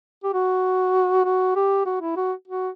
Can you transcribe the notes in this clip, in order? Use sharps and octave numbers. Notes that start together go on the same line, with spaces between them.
G4
F#4
F#4
G4
F#4
E4
F#4
F#4